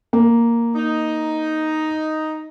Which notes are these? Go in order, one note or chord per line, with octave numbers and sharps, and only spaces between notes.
A#3
D#4